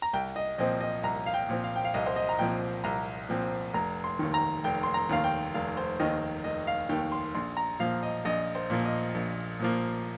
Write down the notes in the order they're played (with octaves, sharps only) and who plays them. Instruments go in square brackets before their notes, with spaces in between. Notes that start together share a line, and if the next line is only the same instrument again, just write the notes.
[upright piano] A#5
C2 G5
D#5
A#2 F3 C4 D#5
D#5
C2 A#5
F5
G5
A#2 F3 C4
F5
G5
F5
C2 D#5
C5
D#5
A#5
A#2 F3 C4 G5
C2 A#5
A#2 F3 C4
F1 A#5
C6
D#2 D#3
A#5
F1 G5
C6
A#5
D#2 D#3 F5
G5
F1 F5
C5
D#2 D#3 D#5
F1 D#5
F5
D#2 D#3 G5
C6
A#1 C6
A#5
A#2 F3 A#3 F5
D#5
A#1 D#5
C5
A#2 F3 A#3
D#5
A#1
A#2 F3 A#3